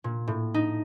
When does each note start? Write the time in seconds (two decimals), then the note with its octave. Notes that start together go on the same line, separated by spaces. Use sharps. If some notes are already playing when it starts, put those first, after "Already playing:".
0.04 A#2
0.28 A2
0.54 D#4